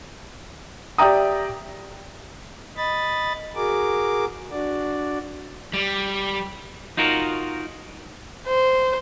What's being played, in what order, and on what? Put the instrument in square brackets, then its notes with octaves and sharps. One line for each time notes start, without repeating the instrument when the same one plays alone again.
[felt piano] G4 D5 E5 G5 A#5 D#6
[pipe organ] D#5 B5 A6
F#4 G#4 A#4 D6
D4 F#4 D5
[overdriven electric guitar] G3
[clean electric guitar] D#4 F4 F#4 A#4
[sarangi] C5